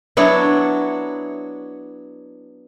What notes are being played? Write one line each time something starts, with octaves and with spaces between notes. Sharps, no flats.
F#3 B3 D4 E4 C#5